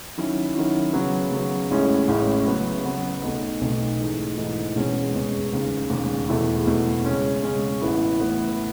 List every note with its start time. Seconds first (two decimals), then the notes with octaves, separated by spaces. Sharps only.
0.18 D#3 F#3 C#4 E4
0.55 D#3 F#3 C#4 E4
0.93 C#3 F#3 B3
1.32 C#3 F#3 B3
1.70 A1 A2 G#3 C#4 E4
2.08 A1 A2 G#3 C#4 E4
2.47 C#3 F#3 B3
2.84 C#3 F#3 B3
3.23 B1 B2 A3 D#4
3.61 B1 B2 A3 D#4
3.99 G#2 E3 A3 D#4 G#4
4.38 G#2 E3 A3 D#4 G#4
4.76 E1 E2 B2 G#3 C#4
5.14 E1 E2 B2 G#3 C#4
5.53 E1 D#2 C#3
5.90 E1 D#2 C#3
6.29 E1 E2 B2 A3 E4
6.67 E1 E2 B2 A3 E4
7.05 C#3 G#3 C#4
7.43 C#3 G#3 C#4
7.82 A1 A2 E3 B3 E4
8.20 A1 A2 E3 B3 E4